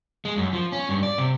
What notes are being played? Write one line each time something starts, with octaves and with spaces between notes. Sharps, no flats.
G#3
F#2
F3
C#4
G2
D5
C3